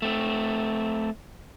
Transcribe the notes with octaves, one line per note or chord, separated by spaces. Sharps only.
A3 C4